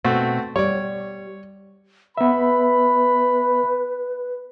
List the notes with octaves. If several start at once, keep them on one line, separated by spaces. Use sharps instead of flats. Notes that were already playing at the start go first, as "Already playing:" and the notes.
B2 A3 C4 F#4
G3 C#5 D5
B3 B4 E5 B5